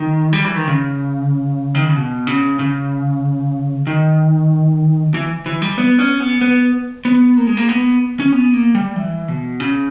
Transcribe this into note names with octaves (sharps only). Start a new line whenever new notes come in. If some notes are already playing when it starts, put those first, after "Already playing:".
Already playing: D#3
G3
E3
D#3
C#3
D#3
C#3
B2
C#3
C#3
D#3
E3
E3
G3
B3
C#4
B3
B3
B3
A#3
G#3
A#3
B3
C#4
B3
A#3
G3
E3
B2
C#3